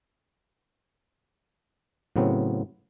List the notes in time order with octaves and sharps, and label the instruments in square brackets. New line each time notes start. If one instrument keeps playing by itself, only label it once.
[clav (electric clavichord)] A2 C#3 F#3 B3 C4